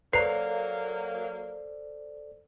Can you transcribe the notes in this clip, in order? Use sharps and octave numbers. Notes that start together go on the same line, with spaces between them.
F#3 A#3 A4 B4 C5 D5 A#5 C7